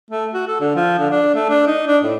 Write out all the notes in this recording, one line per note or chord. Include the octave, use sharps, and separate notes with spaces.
A3
F#4
A4
D3
F3
D3
D4
A3
D4
D#4
D4
A2